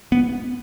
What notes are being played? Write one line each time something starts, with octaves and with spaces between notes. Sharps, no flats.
B3